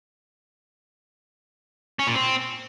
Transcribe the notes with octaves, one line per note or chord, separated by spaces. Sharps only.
C#4
A#2
C4